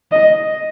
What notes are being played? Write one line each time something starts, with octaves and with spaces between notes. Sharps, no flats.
D#5